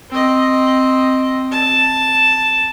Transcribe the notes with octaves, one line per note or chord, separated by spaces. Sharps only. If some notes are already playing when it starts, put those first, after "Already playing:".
C4 D#5
A5